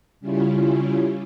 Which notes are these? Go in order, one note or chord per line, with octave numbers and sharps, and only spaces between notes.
C#3 G3 C#4 E4 F4